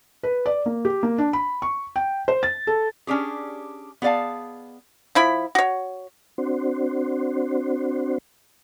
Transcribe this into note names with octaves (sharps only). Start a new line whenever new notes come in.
B4
D5
A#3
G4
A#3
D4
B5
C#6
G5
C5
A6
A4
C#4 D4 G4 G#4
B3 G#4 D5 F5 A5
F3 E4 B5
F#4 C#5
C4 D4 F#4 C5